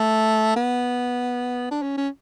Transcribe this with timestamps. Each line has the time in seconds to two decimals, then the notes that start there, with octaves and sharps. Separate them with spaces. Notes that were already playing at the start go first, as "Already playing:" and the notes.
Already playing: A3
0.56 B3
1.71 D4
1.82 C#4
1.97 C#4